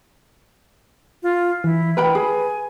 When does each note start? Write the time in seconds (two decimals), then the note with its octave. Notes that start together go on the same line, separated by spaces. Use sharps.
1.23 F4
1.64 E3 E4
1.97 A#4 B4 G5 B5
2.15 G#4 G#5